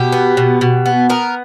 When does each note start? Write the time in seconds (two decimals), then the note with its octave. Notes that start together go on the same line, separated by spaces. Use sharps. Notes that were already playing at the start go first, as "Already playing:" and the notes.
Already playing: B2 G4
0.12 B3
0.37 B2
0.61 B2
0.86 B3
1.09 B3 A#4